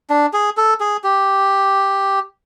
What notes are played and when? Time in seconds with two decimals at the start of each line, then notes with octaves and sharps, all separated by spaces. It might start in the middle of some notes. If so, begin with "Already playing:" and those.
0.10 D4
0.33 G#4
0.57 A4
0.80 G#4
1.04 G4